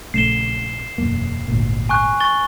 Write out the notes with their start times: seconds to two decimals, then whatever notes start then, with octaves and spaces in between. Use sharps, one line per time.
0.14 A#1 C#3 A3 C7 E7 G7
0.98 E1 F#2 A#3
1.48 G#1 D2 A#2
1.89 G#5 C#6 F#6
2.20 C#6 A6 G7